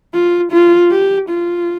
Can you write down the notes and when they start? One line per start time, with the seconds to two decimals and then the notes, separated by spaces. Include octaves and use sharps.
0.14 F4
0.52 F4
0.91 G4
1.29 F4